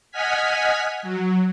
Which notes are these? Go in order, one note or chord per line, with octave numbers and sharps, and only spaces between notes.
D#5 F#5 G#5 F6 G#6 B6
F#3